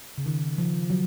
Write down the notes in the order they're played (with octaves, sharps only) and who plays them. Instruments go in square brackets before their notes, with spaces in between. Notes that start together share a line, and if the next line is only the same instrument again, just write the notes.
[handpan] C#3
D#3
F3
F#3